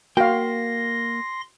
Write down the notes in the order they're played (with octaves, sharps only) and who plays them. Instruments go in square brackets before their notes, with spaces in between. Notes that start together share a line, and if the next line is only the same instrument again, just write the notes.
[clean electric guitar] A#3 [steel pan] F#4 F5 [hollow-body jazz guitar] G5 [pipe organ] C6 A#6